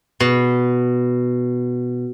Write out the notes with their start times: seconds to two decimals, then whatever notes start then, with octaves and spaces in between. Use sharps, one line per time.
0.20 B2